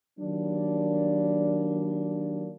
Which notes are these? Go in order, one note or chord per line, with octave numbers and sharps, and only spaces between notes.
D#3 F#3 G3 A#3 D4